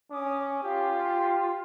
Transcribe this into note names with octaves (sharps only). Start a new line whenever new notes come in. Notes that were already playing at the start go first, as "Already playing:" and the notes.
C#4 D6 D#6
F4 G4